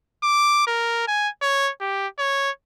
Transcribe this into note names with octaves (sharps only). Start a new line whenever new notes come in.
D6
A#4
G#5
C#5
G4
C#5